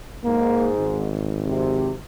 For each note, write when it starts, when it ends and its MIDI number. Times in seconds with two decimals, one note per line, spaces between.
0.25 1.06 44
0.25 0.70 58
0.79 2.00 32
1.46 1.91 48